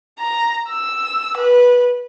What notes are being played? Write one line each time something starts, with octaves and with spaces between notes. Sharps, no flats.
A#5
E6
B4